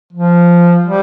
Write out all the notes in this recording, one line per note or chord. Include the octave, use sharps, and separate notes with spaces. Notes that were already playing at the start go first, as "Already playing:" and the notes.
F3
G3